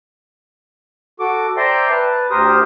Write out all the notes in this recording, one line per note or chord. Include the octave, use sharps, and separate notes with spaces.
F#4 A4 D6
C5 D5 E5 G5 A#5 C6
B4 A5
D2 G4 A#4 C5 D#6